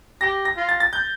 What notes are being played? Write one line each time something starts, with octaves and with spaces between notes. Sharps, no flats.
G4 A#6
A#6
F4
A6
A6
G6